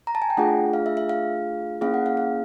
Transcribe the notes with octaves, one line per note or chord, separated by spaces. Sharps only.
A#5
A5
G#5
G5
A3 D4 F4 G#4 F#5
F5
E5
E5
F5
A#3 C#4 E4 G#4 F5
F#5
F5
F5